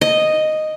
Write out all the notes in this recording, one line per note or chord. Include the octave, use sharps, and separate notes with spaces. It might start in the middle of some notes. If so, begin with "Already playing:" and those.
D#5